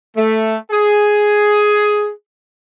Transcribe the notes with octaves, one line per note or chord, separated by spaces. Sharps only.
A3
G#4